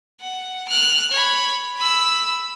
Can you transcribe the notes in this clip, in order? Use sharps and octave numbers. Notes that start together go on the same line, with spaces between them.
F#5
F6 F#6
C#5 B5
B5 E6